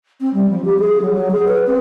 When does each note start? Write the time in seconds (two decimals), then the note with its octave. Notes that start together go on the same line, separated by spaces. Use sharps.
0.20 C4
0.33 G3
0.49 F3
0.64 G4
0.79 G#4
1.01 F#3
1.13 F#3
1.31 G#4
1.48 B4
1.66 C4